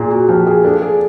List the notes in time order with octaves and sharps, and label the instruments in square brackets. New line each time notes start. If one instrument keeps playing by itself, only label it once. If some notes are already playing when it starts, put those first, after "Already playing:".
Already playing: [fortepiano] A#2 [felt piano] G#4
[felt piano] F#4
[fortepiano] F3 [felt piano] G4
[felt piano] G#4
[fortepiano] D4 [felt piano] A4
[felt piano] G#4